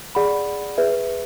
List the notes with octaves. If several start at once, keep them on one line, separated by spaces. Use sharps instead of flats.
G#4 D5 F#5 B5
G#4 B4 E5